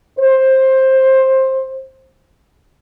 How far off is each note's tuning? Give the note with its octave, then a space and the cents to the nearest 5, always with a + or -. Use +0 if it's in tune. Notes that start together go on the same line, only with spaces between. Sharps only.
C5 +15